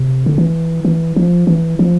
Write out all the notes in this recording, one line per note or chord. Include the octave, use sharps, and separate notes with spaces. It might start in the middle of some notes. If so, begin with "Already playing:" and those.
Already playing: C3
D3
E3
E3
F3
E3
F3